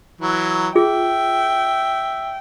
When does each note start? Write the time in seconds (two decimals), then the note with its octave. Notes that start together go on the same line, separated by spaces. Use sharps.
0.21 E3 F#3
0.75 F4 G#4 E5 G5